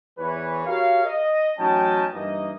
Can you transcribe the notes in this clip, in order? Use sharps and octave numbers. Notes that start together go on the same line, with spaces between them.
E2 E3 B4 C#5
F#4 G4 A#4 C#5 F5
D#5
A1 F#3 C#4 D#4 G5 A5
G2 E3 A#3 D#4 D#5